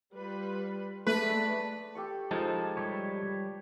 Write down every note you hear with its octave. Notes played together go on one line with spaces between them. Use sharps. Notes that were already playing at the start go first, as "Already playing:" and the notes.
G3 F4 B4
G#3 A3 B4 D5 A5
G4 A4 C#6
F3 G#3 D#4 A4 A5
G3 B4 C#5